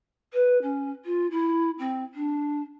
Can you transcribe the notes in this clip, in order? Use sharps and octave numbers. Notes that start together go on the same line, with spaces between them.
B4
C#4
F4
E4
C4
D4